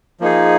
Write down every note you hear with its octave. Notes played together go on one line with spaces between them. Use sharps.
F3 A#3 D#4 G#4